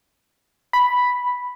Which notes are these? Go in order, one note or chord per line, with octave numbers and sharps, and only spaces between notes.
B5